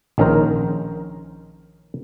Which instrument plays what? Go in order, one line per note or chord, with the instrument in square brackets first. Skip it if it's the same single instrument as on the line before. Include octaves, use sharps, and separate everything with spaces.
[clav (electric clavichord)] A#1 D#3 C#4 G#4 A#4 C5